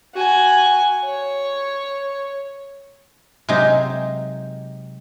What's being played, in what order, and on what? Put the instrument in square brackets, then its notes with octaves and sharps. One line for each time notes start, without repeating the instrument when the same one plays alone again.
[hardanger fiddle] F#4 G#5
C#5
[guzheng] C3 F#3 G#3 D#4 G4